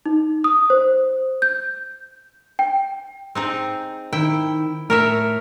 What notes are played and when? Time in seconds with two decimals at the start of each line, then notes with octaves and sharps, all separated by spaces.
0.06 D#4
0.44 D#6
0.70 C5
1.42 G6
2.59 G5
3.35 C4 D#4 G#4
4.13 D#3 E4 G5
4.90 A2 A#4 C#5 E5